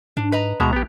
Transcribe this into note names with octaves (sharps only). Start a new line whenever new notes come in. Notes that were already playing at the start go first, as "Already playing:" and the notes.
G#2 D4
B4 D#5 A#5
D2 B2 G#3 E5 A#5
A#1 B3 G4